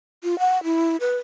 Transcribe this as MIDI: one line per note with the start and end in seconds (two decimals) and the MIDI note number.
0.24 0.39 65
0.39 0.62 78
0.64 0.96 64
1.00 1.17 71